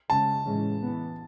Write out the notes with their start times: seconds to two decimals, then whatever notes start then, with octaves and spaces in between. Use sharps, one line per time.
0.10 C#3 G#3 C#4 A5
0.45 A2 E3 G#3 C#4
0.82 E3 B3